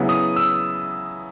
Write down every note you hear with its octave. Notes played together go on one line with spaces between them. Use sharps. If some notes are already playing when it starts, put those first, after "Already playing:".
Already playing: C#3 F#3 B3 E4
D#6
E6